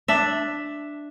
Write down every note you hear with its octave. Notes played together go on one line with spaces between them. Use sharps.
D4 E5